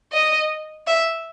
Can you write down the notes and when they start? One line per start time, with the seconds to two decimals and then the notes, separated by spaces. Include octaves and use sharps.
0.12 D#5
0.87 E5